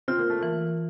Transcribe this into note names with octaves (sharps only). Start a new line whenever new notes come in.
C4 F4
A#3
A3
E3 A#3